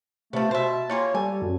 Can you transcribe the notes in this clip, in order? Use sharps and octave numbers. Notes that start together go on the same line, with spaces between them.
C3 F3 A3 B3
B2 C5 E5 A5
G3 A#3 F4 G#4 C#5
G3 A4 G#5
F#2